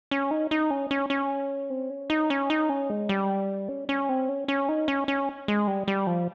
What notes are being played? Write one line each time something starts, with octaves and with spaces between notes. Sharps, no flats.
C#4
D#4
D#4
C#4
C#4
C#4
C4
C#4
D#4
C#4
D#4
C#4
G#3
G3
C#4
C#4
C4
C#4
C#4
D#4
C#4
C#4
G#3
G3
G3
F3